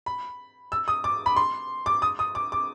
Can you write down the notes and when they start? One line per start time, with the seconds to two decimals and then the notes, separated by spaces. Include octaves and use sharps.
0.06 B5
0.72 E6
0.88 D#6
1.04 D6
1.26 B5
1.36 C6
1.86 D6
2.02 D#6
2.19 D#6
2.35 D6
2.52 D6